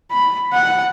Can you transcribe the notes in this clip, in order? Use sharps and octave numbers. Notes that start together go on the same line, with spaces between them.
B5
F#5